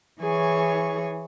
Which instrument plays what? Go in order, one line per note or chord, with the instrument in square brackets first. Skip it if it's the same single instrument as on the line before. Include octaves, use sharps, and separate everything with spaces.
[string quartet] E3 G#4 C#5 C#6